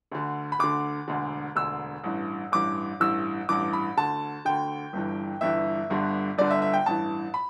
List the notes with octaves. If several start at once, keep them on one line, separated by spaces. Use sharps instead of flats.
D2 D3
B5
D2 D3 D6
E1 D2 D3
E1 D2 D3 E6
A1 G2 E3
A1 G2 E3 D6
A1 G2 E3 E6
A1 G2 E3 D6
B5
D2 D3 A5
D2 D3 G5
G1 G2 E3
G1 G2 E3 E5
G1 G2 D3
G1 G2 D3 D5
E5
E5
G5
A1 G2 E3 A5
B5